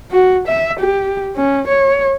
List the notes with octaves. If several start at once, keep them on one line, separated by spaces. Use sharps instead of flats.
F#4
E5
G4
C#4
C#5